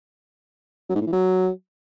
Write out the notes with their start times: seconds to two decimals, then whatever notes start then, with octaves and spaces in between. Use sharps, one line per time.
0.89 F#3
0.95 G#2
1.01 A2
1.06 E3
1.12 F#3